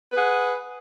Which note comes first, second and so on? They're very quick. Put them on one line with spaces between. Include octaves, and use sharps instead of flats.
B4 G#4 F#5